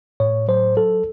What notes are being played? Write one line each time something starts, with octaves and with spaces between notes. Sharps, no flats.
A2 C#5
F#3 C5
F#3 A4